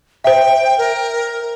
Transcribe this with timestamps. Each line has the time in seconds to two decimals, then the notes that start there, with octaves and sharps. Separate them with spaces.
0.24 C5 E5 G5
0.78 A#4